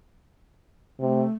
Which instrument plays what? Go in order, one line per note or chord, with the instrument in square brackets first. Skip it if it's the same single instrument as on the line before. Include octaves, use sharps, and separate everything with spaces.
[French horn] C3 [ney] A3